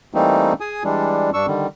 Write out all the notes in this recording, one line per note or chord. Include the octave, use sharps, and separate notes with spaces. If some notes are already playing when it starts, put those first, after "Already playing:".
E3 G3 A3 A#3 C4 D#4
G#4 G#5 D#6
E3 G3 G#3 D4
G2 D4 C#6 E6
D3 D#3 G3